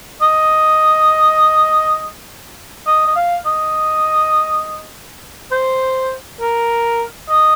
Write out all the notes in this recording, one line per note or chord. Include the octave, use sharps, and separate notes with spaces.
D#5
D#5
D#5
F5
D#5
C5
A#4
D#5